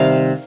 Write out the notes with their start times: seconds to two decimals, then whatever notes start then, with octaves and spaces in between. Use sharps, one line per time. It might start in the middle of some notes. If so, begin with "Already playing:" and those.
Already playing: C3 D#3 G3 F5